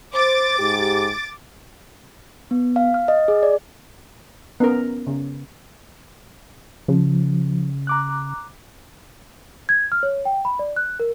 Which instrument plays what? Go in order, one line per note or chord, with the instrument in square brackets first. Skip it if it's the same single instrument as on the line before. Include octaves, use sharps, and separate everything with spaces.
[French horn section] C5 [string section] D6 A6
[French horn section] G#2 G4
[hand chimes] B3
F5
F6
D#5
G#4
D5
[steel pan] B3 C#4 A#4
C#3
[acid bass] C#3 [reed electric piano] F3
[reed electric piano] A#5 D6 F#6
[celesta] G#6
F6
C#5
G5
B5
D5
F#6
A#4